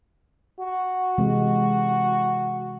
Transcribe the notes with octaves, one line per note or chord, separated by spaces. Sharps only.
F#4
C3 E3 G#3